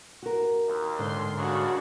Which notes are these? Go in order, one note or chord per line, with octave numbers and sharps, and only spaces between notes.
F#4 A#4
D#2
G#2 D3 C6
D#2 C#3 D4 F#4